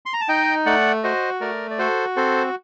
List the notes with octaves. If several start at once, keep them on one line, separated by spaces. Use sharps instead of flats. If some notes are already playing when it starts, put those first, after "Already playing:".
C6
A#5
A5
D#4 D#5 G5
A3 D5 F#5
F#4 C5 D#5
A3 A#4 D5
D5
F#4 A4 C5
C4 A4 C5